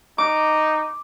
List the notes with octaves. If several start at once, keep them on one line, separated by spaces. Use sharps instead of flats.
D#4 D6